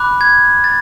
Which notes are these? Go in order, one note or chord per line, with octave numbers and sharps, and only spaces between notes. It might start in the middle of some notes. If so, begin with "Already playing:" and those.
Already playing: B5 D6 F#6
G#6
A6